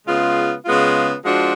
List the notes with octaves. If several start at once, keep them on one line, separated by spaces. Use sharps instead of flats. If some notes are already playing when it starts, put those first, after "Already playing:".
C#3 G#3 B3 F4
C#3 G#3 B3 F4
F3 G#3 D4 F#4